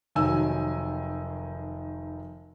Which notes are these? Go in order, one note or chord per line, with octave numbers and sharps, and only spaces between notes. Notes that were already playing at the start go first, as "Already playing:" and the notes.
F1 D#3 F#3 G#5 E6